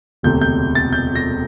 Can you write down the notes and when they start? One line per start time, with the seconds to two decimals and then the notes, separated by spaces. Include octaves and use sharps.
0.23 E1 D2 C3 G6
0.41 G6
0.75 A6
0.93 G6
1.16 A#6